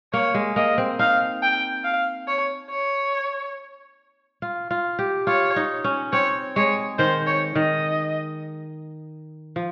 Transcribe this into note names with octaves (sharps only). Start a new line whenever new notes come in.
A#3 C#5
G#3
A#3 D#5
C4
D#4 F5
G5
F5
C#5
C#5
F4
F4
G4
F4 C#5
D#4
C#4
C4 C#5
G#3 C#5
D#3 C5
C#5
D#3 D#5
F3